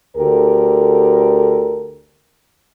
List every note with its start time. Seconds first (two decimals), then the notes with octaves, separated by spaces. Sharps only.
0.17 D2 G4 A4 A#4